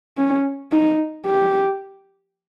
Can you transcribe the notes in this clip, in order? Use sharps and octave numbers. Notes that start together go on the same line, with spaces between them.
C#4
D#4
G4